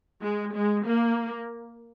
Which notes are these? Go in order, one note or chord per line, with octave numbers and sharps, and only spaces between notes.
G#3
G#3
A#3